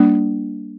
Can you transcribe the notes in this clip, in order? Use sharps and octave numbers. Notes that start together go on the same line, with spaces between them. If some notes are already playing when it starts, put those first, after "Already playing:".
Already playing: G3 A#3 D4